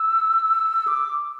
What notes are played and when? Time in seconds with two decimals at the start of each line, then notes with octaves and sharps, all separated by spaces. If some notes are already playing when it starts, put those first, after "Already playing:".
Already playing: E6
0.88 D6